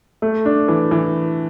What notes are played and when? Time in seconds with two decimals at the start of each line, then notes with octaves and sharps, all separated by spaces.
0.22 A3
0.46 D4
0.68 E3
0.91 E3